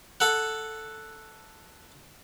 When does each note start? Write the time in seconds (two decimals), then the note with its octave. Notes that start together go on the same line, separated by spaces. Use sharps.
0.20 A4 F#5